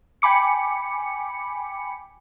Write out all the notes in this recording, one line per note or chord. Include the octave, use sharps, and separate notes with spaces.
G5 G#5 B5 D6 C#7